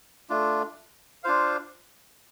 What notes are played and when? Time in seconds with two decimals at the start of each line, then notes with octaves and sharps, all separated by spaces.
0.30 A3 D4 F4
1.23 D4 F4 C5 F5